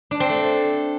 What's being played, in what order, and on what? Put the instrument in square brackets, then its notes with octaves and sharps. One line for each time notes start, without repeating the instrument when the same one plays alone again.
[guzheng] D4
C4
A3